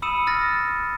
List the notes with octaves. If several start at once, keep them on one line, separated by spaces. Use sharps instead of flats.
B5 D#6 E6 C#7 D#7 E7
D#6 F6 A6 A#6